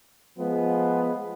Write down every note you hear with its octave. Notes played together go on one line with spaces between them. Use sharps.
F3 G#3 B3